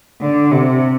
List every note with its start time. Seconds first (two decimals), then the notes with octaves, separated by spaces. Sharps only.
0.22 D3
0.52 C3